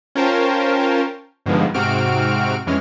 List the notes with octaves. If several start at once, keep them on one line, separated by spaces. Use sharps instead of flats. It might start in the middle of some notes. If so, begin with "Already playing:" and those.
C#4 F4 A#4 C5 G5 A5
G2 B2 D3 D#3 F3 G#3
G#2 C3 C4 F#4 F6 D7
F2 E3 G#3 C#4 F6